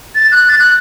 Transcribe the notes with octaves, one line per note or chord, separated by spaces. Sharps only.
A6
F#6
A6
F#6